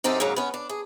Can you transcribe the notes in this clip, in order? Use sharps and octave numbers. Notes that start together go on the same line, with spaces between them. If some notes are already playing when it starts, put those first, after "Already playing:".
F#2 C4 D#4 G4 A4
G#2 C#3 F#3 A#3
B3 C#4
D4
G#4